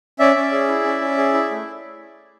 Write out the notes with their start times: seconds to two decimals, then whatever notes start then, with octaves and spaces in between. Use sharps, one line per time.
0.19 C#4 D5 E5
0.36 C#4
0.52 G#4
0.68 E4
0.85 C#4
1.01 C#4
1.18 G#4
1.34 E4
1.51 A3